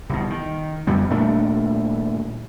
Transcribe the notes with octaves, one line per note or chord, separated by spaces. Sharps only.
C2 B2
D#3
F2 G3 B3
D#1 A#2 A3 D4